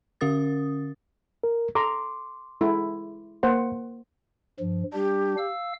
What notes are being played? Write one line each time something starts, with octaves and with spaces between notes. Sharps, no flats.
D3 C#4 A#4 D#6 A6
A#4
A4 A#5 C6 D6
G#3 E4 A4
A#3 C5 F#5
G2 F3
G3 D4 G4
F5 E6